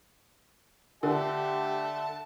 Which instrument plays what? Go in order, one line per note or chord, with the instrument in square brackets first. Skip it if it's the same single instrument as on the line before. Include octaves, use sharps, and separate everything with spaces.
[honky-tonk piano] D3 [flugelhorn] G4 [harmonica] E5 A5